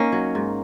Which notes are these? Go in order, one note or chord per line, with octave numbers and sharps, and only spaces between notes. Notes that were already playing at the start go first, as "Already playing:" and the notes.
Already playing: A#3 C#4 D#4
F#3
G#2